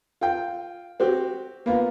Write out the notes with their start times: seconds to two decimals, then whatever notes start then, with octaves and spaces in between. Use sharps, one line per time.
0.21 F4 G5
1.00 C4 F#4 G4
1.66 A#3 B3 F4